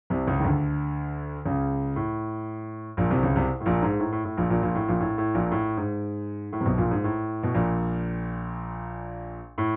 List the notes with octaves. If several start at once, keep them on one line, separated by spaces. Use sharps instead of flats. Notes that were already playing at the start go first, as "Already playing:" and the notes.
C2 C3
C#2 C#3
D#3
D2 D3
C#2 C#3
A2
A#1 A#2
C2 C3
C#2 C#3
C2 C3
A2
A#1 A#2
G#2
A2
A2
A2
A#1 A#2
A#1 A#2
A#1 A#2
A2
A#1 A#2
A2
A2
A#1 A#2
A2
G#2
A2
C3
B1 B2
A#1 A#2
G#2
A2
B2
A#1 A#2
A2